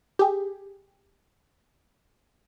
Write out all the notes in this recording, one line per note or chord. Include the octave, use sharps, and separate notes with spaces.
G4 G#4